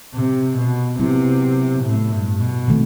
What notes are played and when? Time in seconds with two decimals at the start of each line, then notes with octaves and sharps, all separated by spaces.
0.15 C3
0.58 B2
0.99 C3 F#3 B3 E4
1.83 A2
2.12 G2
2.40 B2
2.68 C3 D#3 A3